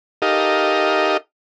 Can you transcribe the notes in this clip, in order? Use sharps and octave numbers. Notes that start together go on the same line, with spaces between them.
D#4 G4 A4 A#4 D#5 F5